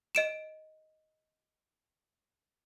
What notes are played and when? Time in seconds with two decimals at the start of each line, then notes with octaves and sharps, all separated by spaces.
0.15 D#5 D7 E7